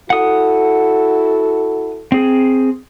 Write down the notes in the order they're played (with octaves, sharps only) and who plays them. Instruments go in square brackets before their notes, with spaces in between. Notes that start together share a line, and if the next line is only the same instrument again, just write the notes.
[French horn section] E4 F#4 A4 [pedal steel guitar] F#5 D#6
[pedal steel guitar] C4 G#4